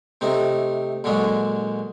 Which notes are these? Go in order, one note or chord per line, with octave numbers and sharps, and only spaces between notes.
C3 A3 C4 D#4
A#1 D3 F#3 G#3 D4